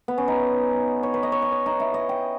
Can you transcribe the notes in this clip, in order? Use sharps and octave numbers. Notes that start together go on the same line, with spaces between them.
B3
C#4
D#4
C#5
B4
D#5
C#5
D#5
C#5
D#4
E4
D#5
G5